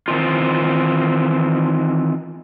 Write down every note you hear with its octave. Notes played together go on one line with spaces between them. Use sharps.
D#3 E3 C4 D#4 F4